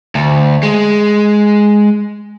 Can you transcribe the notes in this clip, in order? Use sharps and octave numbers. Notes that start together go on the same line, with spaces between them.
D2
G#3